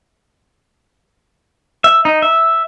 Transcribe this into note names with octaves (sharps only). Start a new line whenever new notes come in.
E5
D#4
E5